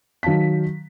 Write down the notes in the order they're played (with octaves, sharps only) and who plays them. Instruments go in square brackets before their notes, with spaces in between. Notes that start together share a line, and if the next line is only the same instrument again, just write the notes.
[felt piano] D#3 F#3 F5 A5 B6